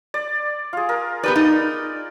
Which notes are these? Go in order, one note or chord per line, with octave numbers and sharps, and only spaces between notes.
D5
F4 G#4
A#4
B3 G4 B4 D5
D#4